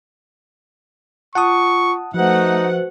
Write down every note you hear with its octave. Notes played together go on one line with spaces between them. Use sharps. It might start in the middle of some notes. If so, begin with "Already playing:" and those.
F4 F#5 A5 C#6 D#6
F3 A3 D#4 F#4 B4 C5 F#5